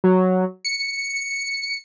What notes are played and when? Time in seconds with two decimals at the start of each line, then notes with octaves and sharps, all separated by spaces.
0.04 F#3
0.65 C#7